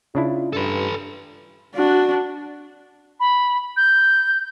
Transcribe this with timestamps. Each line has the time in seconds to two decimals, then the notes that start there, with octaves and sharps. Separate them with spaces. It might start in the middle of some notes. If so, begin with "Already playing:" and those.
0.15 C#3 D4 E4 F4
0.53 G2 A4 B4
1.76 D4 F#4
3.20 B5
3.77 G6